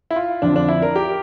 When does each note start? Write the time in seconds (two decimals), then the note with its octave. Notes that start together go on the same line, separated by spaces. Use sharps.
0.11 E4
0.16 F4
0.42 F2 D3 F3 D4
0.56 D4
0.68 E4
0.82 A#4
0.96 G4